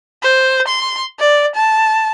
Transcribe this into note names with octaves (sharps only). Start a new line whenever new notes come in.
C5
C6
D5
A5